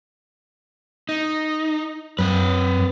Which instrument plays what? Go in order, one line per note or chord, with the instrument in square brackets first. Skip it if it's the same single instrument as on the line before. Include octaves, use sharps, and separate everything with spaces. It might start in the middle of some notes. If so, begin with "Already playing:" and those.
[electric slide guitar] D#4
[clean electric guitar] F#2 [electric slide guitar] C4 B4